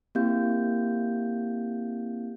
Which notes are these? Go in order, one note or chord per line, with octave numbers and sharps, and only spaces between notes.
A#3 C4 E4 G4 F5 G6